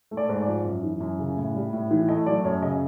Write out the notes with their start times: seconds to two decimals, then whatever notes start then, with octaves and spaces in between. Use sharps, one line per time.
0.11 A3
0.17 D5
0.29 G#2
0.41 D5
0.47 F3
0.65 F#2
0.83 E3
1.00 F#2
1.19 C#3
1.37 A2
1.55 G3
1.73 A2
1.91 E3
2.09 A3 D#5
2.26 F#3 D5
2.44 F#2 C#5
2.62 C#3 D#5